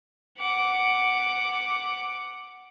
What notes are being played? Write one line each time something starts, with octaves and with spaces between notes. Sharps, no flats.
F#5 D6